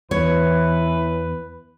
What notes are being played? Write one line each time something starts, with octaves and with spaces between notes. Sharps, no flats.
E2 E3 B4 C#5